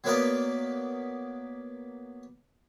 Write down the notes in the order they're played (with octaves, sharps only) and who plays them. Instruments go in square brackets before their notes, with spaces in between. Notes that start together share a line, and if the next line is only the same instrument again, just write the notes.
[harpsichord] F#3 A#3 B3 B4 D5 D#5